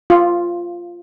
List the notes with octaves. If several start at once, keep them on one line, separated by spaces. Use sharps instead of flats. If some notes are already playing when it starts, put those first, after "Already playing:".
F4